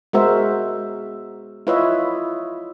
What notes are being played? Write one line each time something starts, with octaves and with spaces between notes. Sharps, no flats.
G#3 B3 F#4 A#4 C5 E5
E4 F4 B4 C#5 D#5 E5